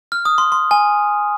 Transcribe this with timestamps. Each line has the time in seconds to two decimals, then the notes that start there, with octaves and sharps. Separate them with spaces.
0.12 F6
0.25 D#6
0.38 C6
0.52 C6
0.71 G#5